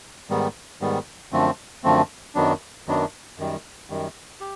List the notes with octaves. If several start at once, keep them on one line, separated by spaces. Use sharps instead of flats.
G#2 D#3 G3 B3
G#2 D#3 G3 B3
F#2 D3 F3 A3 C4
F#2 D3 F3 A3 C4
F#2 D#3 F#3 B3 D4
F#2 D#3 F#3 B3 D4
F#2 D#3 G3
F#2 D#3 G3
G4